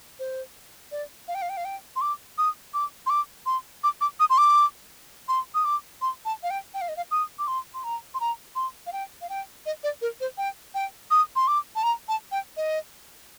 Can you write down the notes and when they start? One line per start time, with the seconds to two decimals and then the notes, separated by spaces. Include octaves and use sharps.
0.19 C5
0.91 D5
1.28 F5
1.35 G5
1.42 F5
1.49 G5
1.57 F5
1.65 G5
1.96 C6
2.01 D6
2.38 D#6
2.74 D6
3.06 C6
3.10 D6
3.46 C6
3.83 D6
4.01 D6
4.20 D#6
4.30 C6
4.38 D6
5.28 C6
5.54 D#6
5.65 D6
6.02 C6
6.25 A5
6.43 F5
6.50 G5
6.74 G5
6.81 F5
6.88 D#5
6.97 F5
7.11 D#6
7.39 D6
7.47 C6
7.74 C6
7.84 A#5
8.14 C6
8.20 A#5
8.55 C6
8.86 F5
8.92 G5
9.21 F5
9.29 G5
9.66 D#5
9.83 D5
10.01 A#4
10.20 C5
10.38 G5
10.74 G5
11.11 D#6
11.36 C6
11.48 D6
11.75 A5
11.83 A#5
12.08 A5
12.32 G5
12.57 D#5